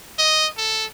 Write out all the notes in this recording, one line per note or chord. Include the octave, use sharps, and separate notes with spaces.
D#5
A4